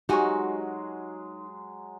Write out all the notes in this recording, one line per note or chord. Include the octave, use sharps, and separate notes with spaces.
F#3 G#3 D#4 F#4 G4 G#5 C#6